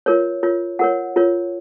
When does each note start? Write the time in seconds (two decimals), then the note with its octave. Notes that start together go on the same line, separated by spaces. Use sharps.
0.06 F4 A#4 C#5
0.43 F4 A#4 C#5
0.79 F4 A#4 C#5 F#5
1.16 F4 A#4 C#5